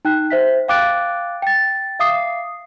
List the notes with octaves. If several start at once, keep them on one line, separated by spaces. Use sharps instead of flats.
D#4 G5 F#6
C5 E5 B6
F5 G5 D6 F#6 A6 D7
G5 A6
E5 F5 D6 D#6 C7